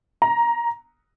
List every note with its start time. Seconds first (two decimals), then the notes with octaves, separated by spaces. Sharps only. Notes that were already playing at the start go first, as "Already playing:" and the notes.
0.22 A#5